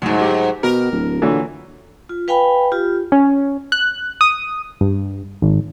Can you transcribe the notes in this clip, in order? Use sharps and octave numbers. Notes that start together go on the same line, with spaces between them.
D2 G#2 F#3
G4
B2 A#4
D1
A#2 D3 E3 F#3
F4
B4 F5 G5 G#5 B5
F4 G4
C#4
F#6
D#6
G2
G#1